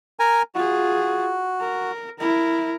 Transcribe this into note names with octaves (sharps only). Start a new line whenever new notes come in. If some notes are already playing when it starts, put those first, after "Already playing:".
A#4 G#5 A#5
F4 F#4 G#4
A#4
E4 A#4